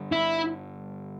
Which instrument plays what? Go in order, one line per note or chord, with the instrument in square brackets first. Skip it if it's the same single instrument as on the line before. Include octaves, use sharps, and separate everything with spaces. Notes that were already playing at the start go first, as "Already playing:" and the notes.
Already playing: [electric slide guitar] G2 D3 G3 D4
[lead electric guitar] E4